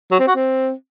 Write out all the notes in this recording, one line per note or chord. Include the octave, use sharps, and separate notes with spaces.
F#3
C4
F#4
C4